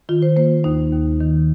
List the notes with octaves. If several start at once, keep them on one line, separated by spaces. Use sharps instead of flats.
D#3 F4
C5
A#3 C5
D#2 D#4
D#2
D#3